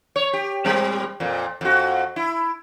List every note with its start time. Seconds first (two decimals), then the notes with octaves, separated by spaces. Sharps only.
0.16 C#5
0.33 G4
0.65 A#2 G3 C4
1.20 F2 A#2
1.61 F2 F#4
2.16 E4